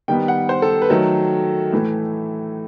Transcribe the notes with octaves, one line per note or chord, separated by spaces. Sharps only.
D#3 G3 B3 G5
F#5
C5
A4
B4
D#3 F#3 A3 A4
A2 E3 A3